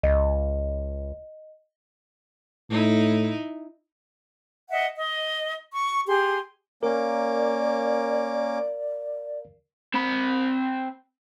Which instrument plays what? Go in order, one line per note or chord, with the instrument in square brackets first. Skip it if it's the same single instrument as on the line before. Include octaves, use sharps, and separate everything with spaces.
[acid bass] C#2 [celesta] D#5
[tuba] A2 [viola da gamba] D#4 E4
[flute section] D#5 E5 F#5
D#5
C#6
G4 G#4 C6
[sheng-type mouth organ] A#3 C#4 D6 [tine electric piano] A#4 F5 [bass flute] D5
[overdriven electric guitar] C4 B5